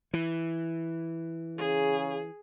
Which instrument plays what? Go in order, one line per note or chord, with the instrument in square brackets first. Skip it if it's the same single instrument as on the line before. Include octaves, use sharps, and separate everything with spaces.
[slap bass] E3
[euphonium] C#3 [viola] G#4